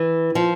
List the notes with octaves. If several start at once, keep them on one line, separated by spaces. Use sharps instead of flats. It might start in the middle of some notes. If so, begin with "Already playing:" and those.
Already playing: E3
F3